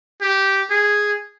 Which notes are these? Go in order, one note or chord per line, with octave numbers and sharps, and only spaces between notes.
G4
G#4